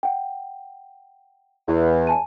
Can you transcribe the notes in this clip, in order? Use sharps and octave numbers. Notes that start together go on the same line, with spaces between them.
F#5 G5
E2
G#5 A5 D#7